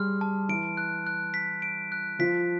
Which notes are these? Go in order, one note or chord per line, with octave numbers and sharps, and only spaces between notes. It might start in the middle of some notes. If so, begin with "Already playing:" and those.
Already playing: G3 G4 G#4 C6 F6
A5
E3 E4 D7
F#6
F#6
B6
D7
F#6
F3 F4 B6